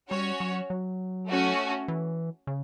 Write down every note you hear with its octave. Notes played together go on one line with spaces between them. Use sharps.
G3 C#4 F#4 C#5
F#3
F#3
A3 C#4 F#4
E3
C#3